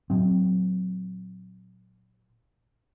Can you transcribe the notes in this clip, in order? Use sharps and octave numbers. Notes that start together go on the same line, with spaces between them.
A#2 F#3 C4